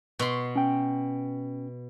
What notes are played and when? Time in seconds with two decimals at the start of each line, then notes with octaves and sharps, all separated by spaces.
0.19 B2 C6
0.56 C#4 G5